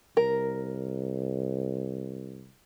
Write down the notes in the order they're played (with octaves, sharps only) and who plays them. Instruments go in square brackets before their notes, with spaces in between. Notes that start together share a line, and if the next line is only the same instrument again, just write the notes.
[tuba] C2 [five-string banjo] A#4